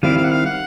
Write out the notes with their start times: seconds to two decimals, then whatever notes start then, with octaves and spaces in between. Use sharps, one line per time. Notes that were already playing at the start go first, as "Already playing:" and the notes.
0.03 D#3 G3 C4 E4 F5
0.17 F5
0.24 F#5
0.31 F5
0.46 F#5